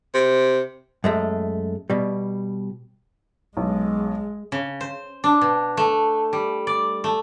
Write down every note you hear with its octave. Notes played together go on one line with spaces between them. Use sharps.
C3
F#2 G#3 A3
B2 G3
B1 G#3
C#3
C5
D4
B2
A3
G3
D5
A3